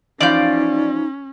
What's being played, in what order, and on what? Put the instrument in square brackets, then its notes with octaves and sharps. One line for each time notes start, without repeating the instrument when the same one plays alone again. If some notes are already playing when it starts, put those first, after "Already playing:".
[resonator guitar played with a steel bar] E3 F3 F5 [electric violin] C#4 [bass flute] D#4 [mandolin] D5 G6